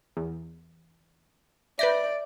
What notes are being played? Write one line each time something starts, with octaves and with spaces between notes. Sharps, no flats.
E2
B4 D5 E5 G6 A#6